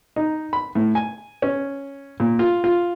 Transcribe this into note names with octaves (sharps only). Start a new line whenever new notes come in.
D#4
B5
A2
G#5
C#4
A#2
F4
F4